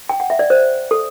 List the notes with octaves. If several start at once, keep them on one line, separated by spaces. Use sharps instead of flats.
G5
F#5
E5
D5
C5
A4